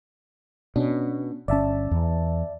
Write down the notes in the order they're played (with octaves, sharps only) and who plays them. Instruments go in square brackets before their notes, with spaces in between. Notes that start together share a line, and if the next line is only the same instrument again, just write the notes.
[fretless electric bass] B2 [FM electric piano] B3 C#4 D4
[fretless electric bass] G1 C#4 [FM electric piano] D5 E5 A5
[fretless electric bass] E2